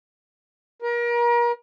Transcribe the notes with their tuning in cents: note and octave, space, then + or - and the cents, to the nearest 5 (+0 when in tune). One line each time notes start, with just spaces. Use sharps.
A#4 +35